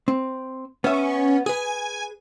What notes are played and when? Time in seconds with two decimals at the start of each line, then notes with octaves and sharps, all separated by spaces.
0.08 C4
0.84 B3 C#4 E5
1.46 G#4 B4 G#5